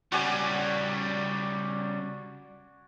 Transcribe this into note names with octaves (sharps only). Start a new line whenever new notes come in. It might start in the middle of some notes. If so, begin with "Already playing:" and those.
C#3 G3 F#4 D5 G#5